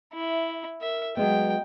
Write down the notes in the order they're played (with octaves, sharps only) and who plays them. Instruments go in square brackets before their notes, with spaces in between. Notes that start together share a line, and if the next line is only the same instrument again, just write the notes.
[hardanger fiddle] E4 [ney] E5
[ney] A#4 [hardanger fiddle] E5
[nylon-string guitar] F#3 G#3 B3 [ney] D#5 [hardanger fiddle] G5